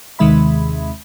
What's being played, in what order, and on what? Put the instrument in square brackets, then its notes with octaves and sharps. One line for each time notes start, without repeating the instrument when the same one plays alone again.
[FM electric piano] D#2 C3 D#3 G#3 E5 B5